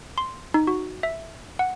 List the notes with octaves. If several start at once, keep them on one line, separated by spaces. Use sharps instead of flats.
C6
D#4
F#4
E5
F#5